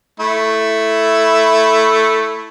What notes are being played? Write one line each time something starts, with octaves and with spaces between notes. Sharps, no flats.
A3 E4